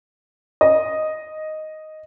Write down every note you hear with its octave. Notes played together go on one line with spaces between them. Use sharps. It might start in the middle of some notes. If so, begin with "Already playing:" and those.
D#5